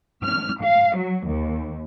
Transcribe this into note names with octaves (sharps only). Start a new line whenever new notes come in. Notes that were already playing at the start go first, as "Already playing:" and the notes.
F6
F5
F#3
D#2